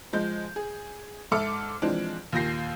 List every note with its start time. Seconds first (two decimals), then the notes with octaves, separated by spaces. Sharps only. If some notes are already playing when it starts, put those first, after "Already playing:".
0.13 F3 G#3 G6
0.56 G#4
1.32 G#2 A4 E5 D6 F6 C#7
1.82 E3 F3 G#3 C4 D4
2.33 D#2 A#2 G6 A#6 C7